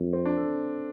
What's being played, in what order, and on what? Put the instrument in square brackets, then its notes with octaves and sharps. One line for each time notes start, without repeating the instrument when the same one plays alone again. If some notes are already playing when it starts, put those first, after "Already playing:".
Already playing: [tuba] F2
[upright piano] C4
D4
A4